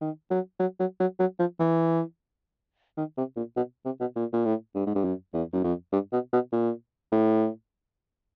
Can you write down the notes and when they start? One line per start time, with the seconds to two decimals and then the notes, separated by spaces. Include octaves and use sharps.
0.01 D#3
0.31 F#3
0.60 F#3
0.80 F#3
1.00 F#3
1.20 F#3
1.39 F3
1.60 E3
2.98 D#3
3.18 C3
3.37 A#2
3.57 B2
3.85 C3
4.01 B2
4.16 A#2
4.33 A#2
4.45 A2
4.75 G2
4.87 G#2
4.95 G2
5.05 F#2
5.34 E2
5.53 F#2
5.64 F2
5.93 G2
6.13 B2
6.33 B2
6.52 A#2
7.12 A2